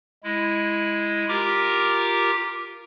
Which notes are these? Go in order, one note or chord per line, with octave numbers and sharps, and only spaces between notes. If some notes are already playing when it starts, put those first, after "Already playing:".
G#3 E4
F4 G4 A#4 A#5 D6